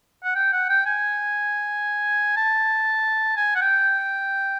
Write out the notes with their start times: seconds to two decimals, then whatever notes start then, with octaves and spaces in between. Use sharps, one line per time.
0.24 F#5
0.35 G5
0.53 F#5
0.69 G5
0.86 G#5
2.37 A5
3.37 G#5
3.56 F#5
3.62 G5